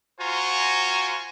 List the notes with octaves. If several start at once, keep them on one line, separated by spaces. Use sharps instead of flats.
F4 F#4 C5 G#5 A#5 C#6